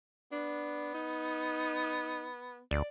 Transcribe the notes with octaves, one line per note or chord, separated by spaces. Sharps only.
B3 D4
D#4
D2 D5